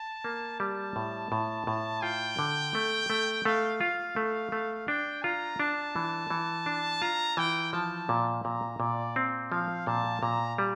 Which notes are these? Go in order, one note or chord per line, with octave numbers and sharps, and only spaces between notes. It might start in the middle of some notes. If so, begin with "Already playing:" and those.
Already playing: A5
A#3
G3 A5
A2
A2
A2
F4 G5
D3
A3
A3
A3 F5
F4
A3
A3
D4 G5
F4 A#5
D4 A5
E3
E3
D4
F4 A#5
E3 G5
F3 A5
A#2
A#2 A#5
A#2 D5
C4
F3 F5
A#2 A5
A#2 A#5
G3